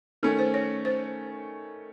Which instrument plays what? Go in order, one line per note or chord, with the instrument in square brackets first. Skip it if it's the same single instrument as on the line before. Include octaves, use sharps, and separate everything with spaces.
[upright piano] D#3 A3 C#4 [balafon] A4
[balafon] C5
C#5
C5